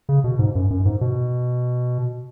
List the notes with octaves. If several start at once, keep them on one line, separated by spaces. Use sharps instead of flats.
C#3
B2
G#2
F#2
F#2
G#2
B2